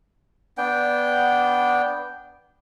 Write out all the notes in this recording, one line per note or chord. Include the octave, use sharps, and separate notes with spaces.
B3 D4 G5